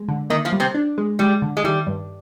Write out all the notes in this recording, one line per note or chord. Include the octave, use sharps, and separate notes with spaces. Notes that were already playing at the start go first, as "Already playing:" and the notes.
Already playing: G#3
D3
D#3 A#3 D#4
F3 F4
G3
C3 C4
D4
G#3
G3 G#3
D3
G#3
D#3 G3
G2